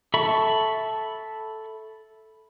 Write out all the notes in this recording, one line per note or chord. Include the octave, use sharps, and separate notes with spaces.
A4 E5 B5 C#6